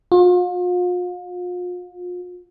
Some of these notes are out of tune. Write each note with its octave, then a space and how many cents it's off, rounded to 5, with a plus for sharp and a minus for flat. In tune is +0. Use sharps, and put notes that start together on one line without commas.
F4 +40